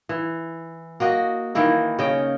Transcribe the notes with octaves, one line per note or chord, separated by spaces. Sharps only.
E3
A#3 F#4 D#5
D#3 E3 A#3 E4
C#3 C#4 D#5 G5